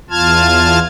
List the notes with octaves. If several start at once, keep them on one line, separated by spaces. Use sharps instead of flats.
E2 F4 A5 F6 G#6